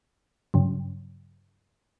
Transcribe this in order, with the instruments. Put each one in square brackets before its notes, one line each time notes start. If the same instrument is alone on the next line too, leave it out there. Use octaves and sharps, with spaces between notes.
[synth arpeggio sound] G2 C#3 F#3